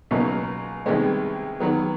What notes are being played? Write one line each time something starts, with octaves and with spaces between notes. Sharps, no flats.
C#2 B2 F#3 A#3 D#4
C2 C3 D#3 G#3 B3
D#3 F#3 B3